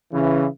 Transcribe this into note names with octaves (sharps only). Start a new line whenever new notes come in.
C#3 E3